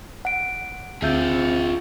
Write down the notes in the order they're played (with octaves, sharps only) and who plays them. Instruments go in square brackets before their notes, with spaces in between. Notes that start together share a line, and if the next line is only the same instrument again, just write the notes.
[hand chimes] F#5 D7
[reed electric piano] D2 E5 G6 [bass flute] C4 [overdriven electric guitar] F4 G#4